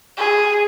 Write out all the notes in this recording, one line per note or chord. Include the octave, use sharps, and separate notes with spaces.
G#4